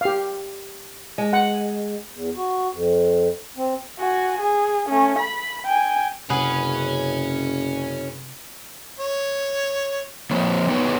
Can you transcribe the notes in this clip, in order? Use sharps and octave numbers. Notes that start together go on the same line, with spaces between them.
G4 F5
G#3
F#5
E2
F#4
F2
C4
F#4 G#5
G#4
A3 C#4
B5
G5 G#5
F#1 C3 C#4 G#4 B4 F#5
C#5
F3 A#3 C4 C#5
B3 D#4 G4 B4 C#5